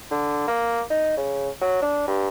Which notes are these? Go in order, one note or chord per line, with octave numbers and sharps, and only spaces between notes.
D3
A#3
D#4
C#3
F#3
D4
G2